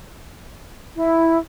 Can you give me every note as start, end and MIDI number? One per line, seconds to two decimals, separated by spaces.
0.96 1.38 64